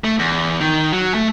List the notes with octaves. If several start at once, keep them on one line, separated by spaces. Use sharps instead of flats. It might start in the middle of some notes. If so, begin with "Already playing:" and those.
A3
E2
D#3
F#3
A3